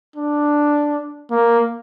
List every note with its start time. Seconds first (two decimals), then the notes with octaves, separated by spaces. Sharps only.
0.16 D4
1.31 A#3